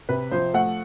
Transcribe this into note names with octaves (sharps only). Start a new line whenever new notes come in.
C3 B4
F3 C5
A3 F#5